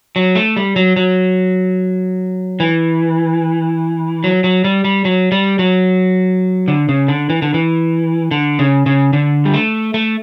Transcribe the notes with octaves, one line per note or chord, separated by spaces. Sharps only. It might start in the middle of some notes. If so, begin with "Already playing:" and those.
F#3
A3
G3
F#3
F#3
E3
F#3
F#3
G3
G3
F#3
G3
F#3
D3
C#3
D3
E3
D3
E3
D3
C#3
C#3
D3
G3
A3
A3